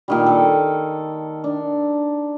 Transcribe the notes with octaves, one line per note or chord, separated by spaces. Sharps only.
A#2 D#3 G3
A4
D4